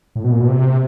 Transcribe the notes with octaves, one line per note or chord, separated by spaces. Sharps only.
A2
B2
A#2
B2
C3